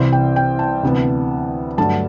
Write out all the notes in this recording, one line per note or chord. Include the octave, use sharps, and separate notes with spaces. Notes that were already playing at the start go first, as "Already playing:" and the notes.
Already playing: C2 C3 E3 C5
G5
G5
A5
D2 C3 E3 B3
G2 D3 F#3 A3 A5